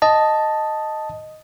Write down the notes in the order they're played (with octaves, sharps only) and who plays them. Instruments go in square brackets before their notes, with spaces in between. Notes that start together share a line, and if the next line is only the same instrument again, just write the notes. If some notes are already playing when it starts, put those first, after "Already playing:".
[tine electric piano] D#5 A5